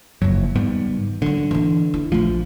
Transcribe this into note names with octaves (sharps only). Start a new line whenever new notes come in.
F#1 F3 F#3
G#2 D#3 G3 B3
D3 F#3 C#4
E3 D4
E4
A#1 F3 A3